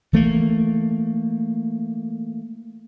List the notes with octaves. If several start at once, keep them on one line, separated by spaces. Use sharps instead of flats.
E3 A3 A#3